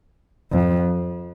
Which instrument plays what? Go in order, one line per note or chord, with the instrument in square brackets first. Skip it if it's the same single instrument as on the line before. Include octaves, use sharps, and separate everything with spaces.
[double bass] F2